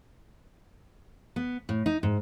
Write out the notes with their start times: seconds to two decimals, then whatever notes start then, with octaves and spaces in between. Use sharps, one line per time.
1.36 B3
1.69 A2
1.86 D#4
2.03 G#2